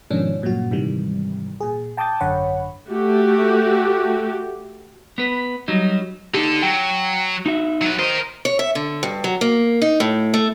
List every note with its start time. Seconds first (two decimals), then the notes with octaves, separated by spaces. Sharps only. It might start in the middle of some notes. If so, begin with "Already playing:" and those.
0.11 G#2 B2 D#3 F3 C#4 D4
0.42 G2 A#2 C#3 F#3 F#4
0.71 G#2 C3 D#3 E3 G3
1.61 A#2 G#4
1.97 G5 A5 D6 D#6 G6 A6
2.20 G#1 F#2 D3 C#5 F#5 B5
2.90 A3 F#4 G4
5.18 B3 B4
5.68 F#3 G3 D#4
6.34 D3 D#4 G4 A4
6.63 F#3 G5
7.46 D#4 F#4 E5
7.81 F#3 B4
7.99 A#4 C5 D#5
8.45 C#5
8.59 E5
8.75 D3
9.03 G2
9.24 F#3
9.41 A#3
9.82 D#4
10.00 A2
10.34 A3